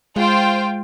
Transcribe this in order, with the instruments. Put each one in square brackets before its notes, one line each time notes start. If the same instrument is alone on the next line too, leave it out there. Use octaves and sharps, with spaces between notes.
[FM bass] G#3 [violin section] F4 C5 G5